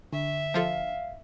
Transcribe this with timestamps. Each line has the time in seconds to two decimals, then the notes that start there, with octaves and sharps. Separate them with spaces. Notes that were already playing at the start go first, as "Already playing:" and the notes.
0.13 D3 E5
0.54 F3 F4 A4 F5